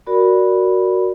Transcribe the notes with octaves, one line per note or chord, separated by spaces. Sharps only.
F#4 A#4 D5 B5